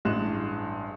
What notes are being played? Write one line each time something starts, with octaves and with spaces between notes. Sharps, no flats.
A1 G2 G#3 G#4 F#6 E7